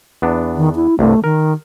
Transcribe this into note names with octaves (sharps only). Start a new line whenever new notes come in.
E2 B3 D4
D#3
E4
C2 G2 C3 A3
D#3 A#4